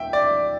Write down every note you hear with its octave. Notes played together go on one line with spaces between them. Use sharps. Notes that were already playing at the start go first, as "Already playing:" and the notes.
Already playing: E5 G5
D5